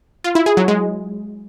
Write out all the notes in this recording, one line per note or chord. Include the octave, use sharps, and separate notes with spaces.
F4
E4
G#4
F#3
G#3